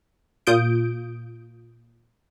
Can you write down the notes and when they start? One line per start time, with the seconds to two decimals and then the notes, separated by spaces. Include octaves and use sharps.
0.47 A#2 F4 D#6 G6 D7